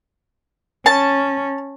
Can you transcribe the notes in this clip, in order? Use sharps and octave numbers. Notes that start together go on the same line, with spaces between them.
C#4 A5